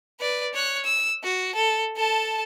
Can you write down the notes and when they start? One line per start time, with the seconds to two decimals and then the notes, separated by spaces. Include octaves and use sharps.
0.19 B4 D5
0.54 C#5 F#6
0.84 E6
1.23 F#4
1.55 A4
1.96 A4 A5